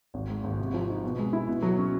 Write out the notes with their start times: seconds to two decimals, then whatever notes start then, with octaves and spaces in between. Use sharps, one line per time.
0.14 G#1
0.30 G#2
0.44 G#1
0.59 C3
0.73 F3
0.89 D#4
1.04 B2
1.19 G#3
1.33 E4
1.48 B2
1.62 F#3
1.78 C#4